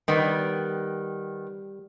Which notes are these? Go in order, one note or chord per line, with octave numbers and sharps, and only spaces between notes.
D#3 G3 B3